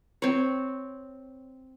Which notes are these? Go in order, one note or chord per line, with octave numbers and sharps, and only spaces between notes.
C4 C#5